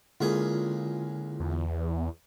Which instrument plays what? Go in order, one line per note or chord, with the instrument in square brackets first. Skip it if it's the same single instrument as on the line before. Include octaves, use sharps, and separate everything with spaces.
[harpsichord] C#2 A#2 G#4 [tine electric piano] D3 E4 F4
[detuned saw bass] E2